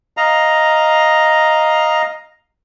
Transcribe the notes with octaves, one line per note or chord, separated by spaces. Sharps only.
D#5 F5 A#5